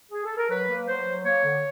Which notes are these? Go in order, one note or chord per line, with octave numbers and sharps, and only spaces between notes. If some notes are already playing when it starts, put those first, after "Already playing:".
G#4
A4
A#4
F#3 B4
A#3
F#3 C5
F#3
A#3 C#5
D3